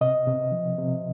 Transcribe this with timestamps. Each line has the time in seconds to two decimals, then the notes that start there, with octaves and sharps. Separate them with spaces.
0.01 C3 D#5
0.27 C3
0.52 F3
0.78 C3